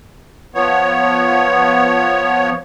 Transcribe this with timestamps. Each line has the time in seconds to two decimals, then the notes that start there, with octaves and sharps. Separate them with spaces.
0.55 F3 B3 C#5